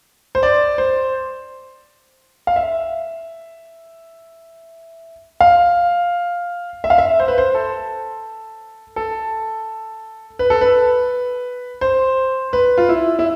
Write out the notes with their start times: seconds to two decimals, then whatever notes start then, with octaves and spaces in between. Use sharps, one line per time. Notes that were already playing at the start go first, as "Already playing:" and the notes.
0.35 C5
0.43 D5
0.78 C5
2.47 F5
2.56 E5
5.41 F5
6.84 E5
6.90 F5
6.98 E5
7.20 C5
7.28 B4
7.38 C5
7.55 A4
8.96 A4
10.39 B4
10.50 A4
10.61 B4
11.81 C5
12.53 B4
12.78 F4
12.89 E4
13.19 E4